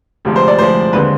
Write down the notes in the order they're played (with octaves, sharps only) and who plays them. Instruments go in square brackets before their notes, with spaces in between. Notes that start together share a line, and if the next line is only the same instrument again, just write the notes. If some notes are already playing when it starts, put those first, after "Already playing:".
[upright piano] D2 C3 F3 G#3
C5
D5
D2 C3 F3 G#3 C5
D#2 D3 G#3 C4 B4